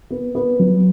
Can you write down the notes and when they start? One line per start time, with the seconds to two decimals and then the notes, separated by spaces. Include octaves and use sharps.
0.11 B3
0.35 B3
0.60 F#3